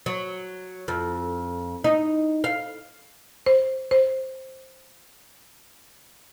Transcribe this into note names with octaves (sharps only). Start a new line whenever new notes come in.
F#3
F2
D#4
F5
C5
C5